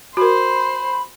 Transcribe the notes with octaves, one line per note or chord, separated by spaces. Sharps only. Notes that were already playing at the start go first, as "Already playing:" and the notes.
F#4 A#4 C5 B5